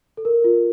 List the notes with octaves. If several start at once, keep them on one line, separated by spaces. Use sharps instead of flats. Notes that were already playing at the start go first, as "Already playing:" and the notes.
A4
A#4
F4